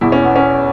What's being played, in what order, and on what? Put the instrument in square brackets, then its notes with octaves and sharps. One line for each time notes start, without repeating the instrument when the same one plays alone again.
[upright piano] E2 B2 E4
C#4
B3
C#4